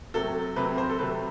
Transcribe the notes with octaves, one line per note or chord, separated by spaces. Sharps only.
C3 F#3 A3 C4 A4
C3 F#3 A3 C4 B4
C5
A4
C3 F#3 A3 C4 B4